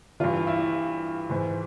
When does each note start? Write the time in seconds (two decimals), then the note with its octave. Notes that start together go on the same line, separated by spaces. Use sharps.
0.20 G2 E3 F4
0.47 E4
1.30 G#2 E3